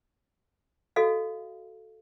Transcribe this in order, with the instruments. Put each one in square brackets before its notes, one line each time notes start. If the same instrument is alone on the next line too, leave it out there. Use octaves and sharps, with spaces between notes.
[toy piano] F#4 A4 D#5 F5